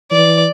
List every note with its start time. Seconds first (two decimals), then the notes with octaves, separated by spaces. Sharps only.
0.12 E3 D5